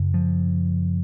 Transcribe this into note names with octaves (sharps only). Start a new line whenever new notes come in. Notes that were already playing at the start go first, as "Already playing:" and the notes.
Already playing: F#2 C#3
F3